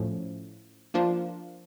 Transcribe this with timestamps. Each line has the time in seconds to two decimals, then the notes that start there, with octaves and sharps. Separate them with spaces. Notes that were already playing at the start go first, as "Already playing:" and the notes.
Already playing: A2 F3 A3 C#4
0.94 F3 A#3 D4 F4